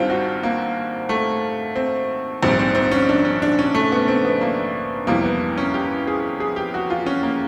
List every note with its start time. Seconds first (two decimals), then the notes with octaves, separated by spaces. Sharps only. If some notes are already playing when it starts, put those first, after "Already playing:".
Already playing: G#1 G2 D#3 G3 C4 F4
0.10 F#4
0.43 A#3
1.09 A3
1.76 C4
2.42 A#1 G#2 D#3 G3 C4
2.59 C4
2.75 C4
2.91 C#4
3.09 D4
3.25 C#4
3.42 D4
3.59 C#4
3.75 A3
3.92 B3
4.08 C4
4.25 B3
4.41 A#3
5.07 F2 C3 E3 G3 A#3
5.24 B3
5.58 C#4
5.74 G4
6.07 G#4
6.40 G#4
6.56 G4
6.74 F#4
6.90 F4
7.06 C#4
7.23 A#3